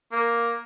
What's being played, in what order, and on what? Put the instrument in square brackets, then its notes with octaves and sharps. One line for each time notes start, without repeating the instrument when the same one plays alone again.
[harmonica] A#3